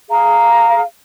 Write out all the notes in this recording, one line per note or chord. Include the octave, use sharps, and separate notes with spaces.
G#4 F5 A#5